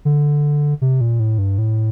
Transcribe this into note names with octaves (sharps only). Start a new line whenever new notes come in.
D3
C3
A#2
A2
G2
A2